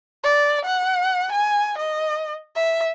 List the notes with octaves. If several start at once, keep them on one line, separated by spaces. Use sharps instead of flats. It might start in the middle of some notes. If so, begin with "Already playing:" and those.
D5
F#5
G#5
D#5
E5